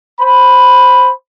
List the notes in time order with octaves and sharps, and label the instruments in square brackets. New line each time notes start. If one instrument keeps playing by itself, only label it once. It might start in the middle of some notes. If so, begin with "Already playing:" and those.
[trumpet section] C5 B5